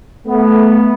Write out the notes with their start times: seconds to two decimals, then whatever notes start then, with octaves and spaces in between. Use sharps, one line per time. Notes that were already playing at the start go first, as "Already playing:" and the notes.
0.27 A3 B3